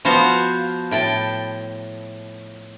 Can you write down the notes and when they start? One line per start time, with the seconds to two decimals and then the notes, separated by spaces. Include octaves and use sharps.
0.05 F3 B3 F#4 C5 F5
0.91 A2 G5 A5